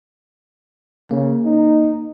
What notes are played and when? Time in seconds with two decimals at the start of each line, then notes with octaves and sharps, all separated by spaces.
1.11 C#3 A#3
1.44 D#4